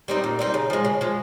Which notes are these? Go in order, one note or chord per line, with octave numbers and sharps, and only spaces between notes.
G3 C4 D#4
A#2
G3 C4 D#4
C#3
F3 G#3
C#3
F3 G#3